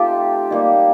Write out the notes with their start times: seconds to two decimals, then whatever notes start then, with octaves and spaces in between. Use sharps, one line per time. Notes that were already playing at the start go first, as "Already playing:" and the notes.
Already playing: A3 C4 D#4 F4 G4 A4
0.51 G3 A#3 D#4